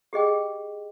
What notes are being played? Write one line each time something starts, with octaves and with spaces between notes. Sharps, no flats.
G4 G#4 D#5 G5